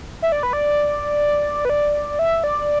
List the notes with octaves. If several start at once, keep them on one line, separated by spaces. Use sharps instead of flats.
E5
D5
B4
D5
B4
D5
E5
D5